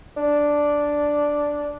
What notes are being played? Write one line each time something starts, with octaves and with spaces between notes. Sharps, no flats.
D4